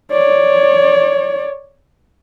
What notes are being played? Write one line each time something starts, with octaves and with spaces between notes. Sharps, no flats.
C#5 D5